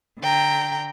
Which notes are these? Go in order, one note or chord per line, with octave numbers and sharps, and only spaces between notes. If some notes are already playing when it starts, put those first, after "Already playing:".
D3 G5 A#5